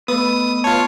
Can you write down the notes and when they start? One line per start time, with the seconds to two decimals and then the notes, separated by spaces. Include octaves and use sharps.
0.08 A3 B3 B4 D#6
0.64 F4 C#5 A5